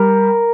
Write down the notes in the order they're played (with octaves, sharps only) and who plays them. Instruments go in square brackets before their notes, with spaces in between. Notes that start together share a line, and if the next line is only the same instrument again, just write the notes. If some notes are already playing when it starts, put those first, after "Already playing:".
Already playing: [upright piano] G3 [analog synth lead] A#4